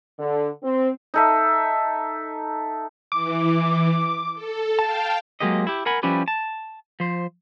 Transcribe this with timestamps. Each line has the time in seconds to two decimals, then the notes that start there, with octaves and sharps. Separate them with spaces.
0.18 D3
0.62 C4
1.14 D#4 A4 E5
3.12 E3 D6
4.35 A4
4.79 F5 G5 A5
5.40 F#3 G#3 A#3 G4 D#5
5.67 E4 G4
5.86 A#4 F#5 G#5 B5
6.03 F3 G3 C#4 E4 G4 B4
6.28 A5
7.00 F3 C5